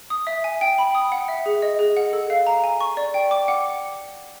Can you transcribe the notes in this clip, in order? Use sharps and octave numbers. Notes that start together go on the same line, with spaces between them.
D#6
E5
G#5
G5
B5
D#6
F#5
E5
G#4
D#5
G#4
F#5
A4
F5
A#5
G#5
C#6
D5
G5
D6
F#5